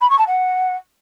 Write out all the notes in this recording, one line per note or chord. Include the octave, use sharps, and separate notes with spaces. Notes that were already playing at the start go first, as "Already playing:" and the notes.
B5
C#6
A5
F#5